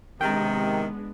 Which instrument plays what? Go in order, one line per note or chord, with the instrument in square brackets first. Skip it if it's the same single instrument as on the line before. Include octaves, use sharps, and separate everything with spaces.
[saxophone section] C3 D#3 [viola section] G#3 B3 D4 [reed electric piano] G5 A#5